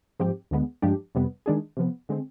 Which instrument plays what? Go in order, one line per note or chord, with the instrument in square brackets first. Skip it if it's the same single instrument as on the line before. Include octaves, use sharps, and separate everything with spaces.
[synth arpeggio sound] G#2 F3 C4 G4
D2 D3 G#3 B3
G2 F3 G#3 D4 G4
F2 C3 G3 B3
D#3 G#3 D4 G#4
C3 F3 B3
D3 G#3 C4